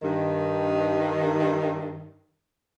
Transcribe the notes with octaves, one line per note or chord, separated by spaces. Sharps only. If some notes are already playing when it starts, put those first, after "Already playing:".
G2 D#3